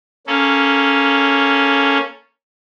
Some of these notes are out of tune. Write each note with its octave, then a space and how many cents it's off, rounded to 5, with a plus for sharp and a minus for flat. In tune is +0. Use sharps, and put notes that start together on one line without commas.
A#3 +0 C#4 +0 A4 -15